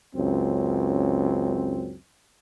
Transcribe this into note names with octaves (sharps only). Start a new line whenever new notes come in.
C#2 F#2 C4